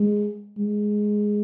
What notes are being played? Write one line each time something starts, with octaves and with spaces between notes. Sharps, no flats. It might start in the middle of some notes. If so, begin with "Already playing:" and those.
Already playing: G#3
G#3